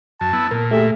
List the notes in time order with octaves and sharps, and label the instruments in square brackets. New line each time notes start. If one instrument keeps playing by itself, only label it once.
[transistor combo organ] F#2 [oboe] A5
[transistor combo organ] B3 E4
[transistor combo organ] A#2 [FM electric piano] A#4
[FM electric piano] A3 G4 G#4 [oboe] E5